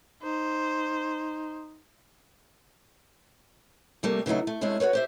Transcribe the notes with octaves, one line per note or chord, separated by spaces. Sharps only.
D#4 C5
C3 G3 A3 A#3
C#3 E3 F#3 A3 D#4
A3
G2 C3 G#3 A3 C#4 E4
F#4 A#4 B4 C#5
G4 C5 E5